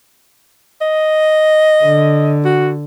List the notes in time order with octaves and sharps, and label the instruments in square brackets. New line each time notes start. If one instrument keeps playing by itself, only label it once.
[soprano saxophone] D#5
[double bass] D3
[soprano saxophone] F#4